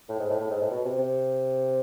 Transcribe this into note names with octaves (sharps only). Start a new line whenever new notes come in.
A2
G#2
A2
A2
G#2
A2
B2
C3
C3